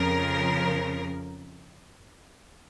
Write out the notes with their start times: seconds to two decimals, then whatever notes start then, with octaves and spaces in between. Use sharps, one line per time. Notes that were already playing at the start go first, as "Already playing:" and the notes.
Already playing: F2 C#3 F3 A#4